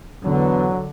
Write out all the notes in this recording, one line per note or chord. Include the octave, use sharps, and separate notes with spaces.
E2 D3 F#3 B3